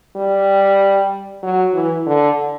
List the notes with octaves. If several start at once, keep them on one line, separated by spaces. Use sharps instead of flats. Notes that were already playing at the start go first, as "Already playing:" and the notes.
G3
F#3
E3
D3